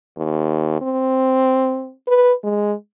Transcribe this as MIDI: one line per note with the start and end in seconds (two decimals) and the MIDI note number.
0.17 0.81 39
0.81 1.92 60
2.07 2.32 71
2.43 2.73 56